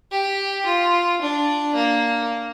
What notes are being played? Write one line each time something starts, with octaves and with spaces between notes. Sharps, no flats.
G4
F4
D4
A#3